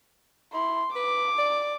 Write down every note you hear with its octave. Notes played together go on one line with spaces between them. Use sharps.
E4 C6
B4 D6
D5